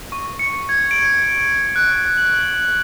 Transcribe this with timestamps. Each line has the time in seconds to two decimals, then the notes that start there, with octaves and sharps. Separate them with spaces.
0.12 C#6
0.39 C#7
0.69 G#6
0.91 D7
1.76 F#6
2.18 F#7